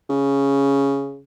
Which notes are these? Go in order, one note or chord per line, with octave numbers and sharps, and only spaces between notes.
C#3